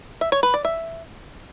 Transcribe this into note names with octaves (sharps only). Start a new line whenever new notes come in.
E5
C#5
B4
D5
E5